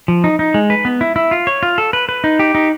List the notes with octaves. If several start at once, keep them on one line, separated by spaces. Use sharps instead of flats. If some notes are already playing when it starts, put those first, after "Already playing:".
F3
D#4
D#4
G#3
B4
B3
E4
E4
F4
C#5
F4
A4
B4
B4
D#4
G4
D#4